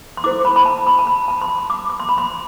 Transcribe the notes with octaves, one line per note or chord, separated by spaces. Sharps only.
C6
E4 A4 C5 D6
B5
B5
A5
B5
A5
B5
A5
C6
B5
D6
D6
C6
B5
C6